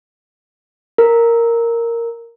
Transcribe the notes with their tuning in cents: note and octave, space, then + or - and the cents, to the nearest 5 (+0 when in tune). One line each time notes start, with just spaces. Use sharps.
A#4 -5